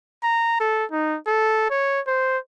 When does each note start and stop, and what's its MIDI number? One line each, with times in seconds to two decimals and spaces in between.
0.23 0.58 82
0.60 0.85 69
0.92 1.17 63
1.27 1.67 69
1.70 2.00 73
2.07 2.38 72